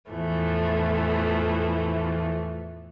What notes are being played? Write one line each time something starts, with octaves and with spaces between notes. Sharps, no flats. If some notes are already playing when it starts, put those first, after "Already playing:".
E2 A2 E3 F3 A3